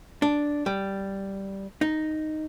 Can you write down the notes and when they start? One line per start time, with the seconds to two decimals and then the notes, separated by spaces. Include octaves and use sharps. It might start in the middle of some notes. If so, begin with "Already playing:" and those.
0.22 D4
0.66 G3
1.81 D#4